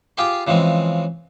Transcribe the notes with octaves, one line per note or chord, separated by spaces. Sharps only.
F4 G4 G#4 G5 C6
C#3 E3 F3 G#3 C4